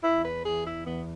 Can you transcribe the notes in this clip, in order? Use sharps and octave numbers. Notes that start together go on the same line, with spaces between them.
E2 E4
B4
E3 G#4
E4
E2 B3